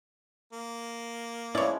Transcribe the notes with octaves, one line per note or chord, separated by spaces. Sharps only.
A#3
C#3 F3 G#3 E4 C#5 D5